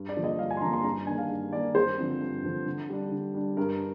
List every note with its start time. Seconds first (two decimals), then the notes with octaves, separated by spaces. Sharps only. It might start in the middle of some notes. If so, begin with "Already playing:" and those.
Already playing: G2
0.09 D5
0.16 D3 F3 A#3
0.24 D#5
0.39 G2 F5
0.50 G#5
0.57 C6
0.62 D3 F3 A#3 A#5
0.73 C6
0.84 G2 A#5
1.07 D#3 A#3 D4 G#5
1.18 F5
1.30 G2
1.53 D#3 A#3 D4 D5
1.75 G2 C5
1.98 D3 F3 C4
2.21 G2
2.43 D3 F3 C4
2.66 D3
2.89 G3 D4
3.12 D3
3.34 G3 D4
3.57 G2 A#4